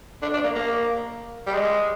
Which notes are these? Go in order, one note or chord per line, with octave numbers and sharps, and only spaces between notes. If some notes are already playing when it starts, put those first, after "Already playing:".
D4
D4
A#3
A#3
G3
G#3